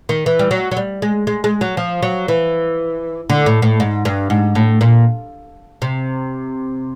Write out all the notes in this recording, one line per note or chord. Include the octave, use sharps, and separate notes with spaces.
D#3
E3
G3
F#3
F#3
G3
G#3
G#3
G#3
F#3
F3
F#3
E3
D3
A2
A2
G#2
G2
G#2
A2
A#2
C3